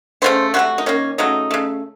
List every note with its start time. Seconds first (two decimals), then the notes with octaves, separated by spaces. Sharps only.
0.22 C#3 F#3 A3 C5
0.54 C3 F#3 A3 F#4
0.78 D#4
0.86 D#3 A#3 C#4
1.18 C#3 F#3 A3 D#4
1.51 C#3 A3